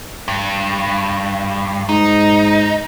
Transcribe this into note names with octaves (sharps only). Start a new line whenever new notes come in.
G2
G#2 D#4